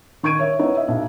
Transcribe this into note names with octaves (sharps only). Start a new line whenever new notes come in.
D#3 C#6 G#6 D7 D#7
C#5 E5
B3 D#4 E4 C#5
D#5 E5
B1